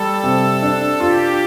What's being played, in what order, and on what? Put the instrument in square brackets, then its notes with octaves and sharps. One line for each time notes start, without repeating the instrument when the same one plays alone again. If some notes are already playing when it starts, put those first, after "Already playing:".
Already playing: [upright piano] G3 [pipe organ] A4
[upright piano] C3
D4
[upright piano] F4 [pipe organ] G4